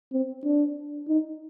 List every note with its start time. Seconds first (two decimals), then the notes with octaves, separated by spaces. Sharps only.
0.13 C4
0.44 D4
1.08 D#4